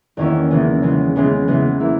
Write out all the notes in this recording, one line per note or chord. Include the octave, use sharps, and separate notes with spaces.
E2 D#3 A#3 C#4 E4
C#3 E3 G#3 B3
C#3 E3 G#3 B3
C#3 E3 G#3 B3
C#3 E3 G#3 B3
E3 A#3 E4